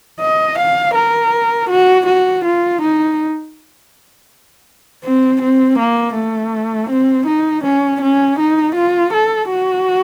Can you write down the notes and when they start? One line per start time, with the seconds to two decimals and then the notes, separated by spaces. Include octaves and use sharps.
0.21 D#5
0.58 F5
0.95 A#4
1.70 F#4
2.06 F#4
2.45 F4
2.82 D#4
5.04 C4
5.42 C4
5.79 A#3
6.15 A3
6.90 C4
7.27 D#4
7.64 C#4
8.02 C#4
8.39 D#4
8.75 F4
9.13 A4
9.50 F#4